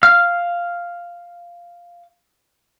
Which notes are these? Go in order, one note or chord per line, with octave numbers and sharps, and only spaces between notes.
F5 F6